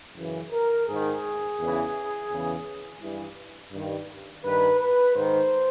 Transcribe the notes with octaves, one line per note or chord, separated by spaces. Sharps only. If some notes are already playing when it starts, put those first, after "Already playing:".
F#2 C#3 E3
A#4
G#2 D#3 G#4
E2 C#3 E3
E2 C#3 E3
G2 E3
G2 D#3
G2 D#3 B4
B4
G#2 D#3 C5